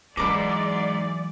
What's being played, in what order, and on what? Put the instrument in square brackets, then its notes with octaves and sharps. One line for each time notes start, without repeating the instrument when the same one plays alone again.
[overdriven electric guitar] G#2 [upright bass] E3 F#3 [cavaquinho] E4 A#4 D6 [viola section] D5